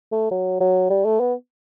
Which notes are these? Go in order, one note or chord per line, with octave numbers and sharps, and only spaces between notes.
A3
F#3
F#3
G3
A3
B3